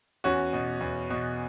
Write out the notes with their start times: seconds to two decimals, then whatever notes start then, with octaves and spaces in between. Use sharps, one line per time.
0.24 E2 C#4 F#4
0.53 B2
0.81 E2
1.10 B2